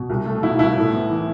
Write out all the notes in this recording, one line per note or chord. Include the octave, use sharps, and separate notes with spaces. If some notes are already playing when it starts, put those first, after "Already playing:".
Already playing: B2
C2
A3
B2 E4
C2 E4
A2
B3
E3